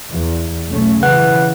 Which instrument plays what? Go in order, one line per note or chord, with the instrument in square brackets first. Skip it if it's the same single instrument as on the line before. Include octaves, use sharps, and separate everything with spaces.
[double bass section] E2
B1 A3 C#4
[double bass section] C#3 E3 [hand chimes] B4 F#5 F#6